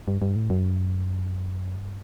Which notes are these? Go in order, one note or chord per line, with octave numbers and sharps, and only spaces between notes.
G2
G2
A2
F#2
G2